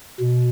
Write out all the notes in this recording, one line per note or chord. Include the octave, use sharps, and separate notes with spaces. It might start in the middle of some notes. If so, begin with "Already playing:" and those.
B2